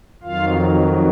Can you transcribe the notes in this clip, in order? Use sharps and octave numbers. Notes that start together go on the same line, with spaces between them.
F2 D#3 F#3 F4 F5